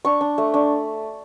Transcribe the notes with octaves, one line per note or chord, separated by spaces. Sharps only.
D4 C#6
D4
A3
D4